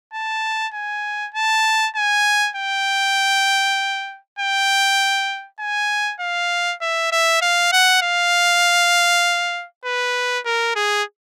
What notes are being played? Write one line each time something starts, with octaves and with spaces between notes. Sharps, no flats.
A5
G#5
A5
G#5
G5
G5
G#5
F5
E5
E5
F5
F#5
F5
B4
A#4
G#4